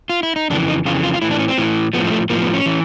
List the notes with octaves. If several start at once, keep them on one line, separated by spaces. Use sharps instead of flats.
F4
E4
D#4
F2 C#3 E3 D4
D#4
F2 C#3 E3 F4
F4
F4
A2 E3 E4
D4
C#4
C4
A2 E3
A2 F3 B3
G#3
A3
A2 F3 A#3
B3
C#4
E3